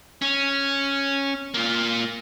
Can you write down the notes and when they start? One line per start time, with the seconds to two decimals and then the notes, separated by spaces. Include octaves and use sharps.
0.22 C#4
1.54 A#3 F4